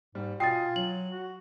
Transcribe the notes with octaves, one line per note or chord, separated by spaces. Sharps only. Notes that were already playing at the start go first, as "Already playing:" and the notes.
G#2 G3
B2 F4 G5 G#5 D#6 A6 C7
F#3 F#7
F#4